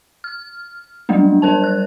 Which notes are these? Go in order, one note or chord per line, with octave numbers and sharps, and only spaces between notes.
F6
F#3 G3 A3 A#3 D4
G3 A#4 C5 A5
F#6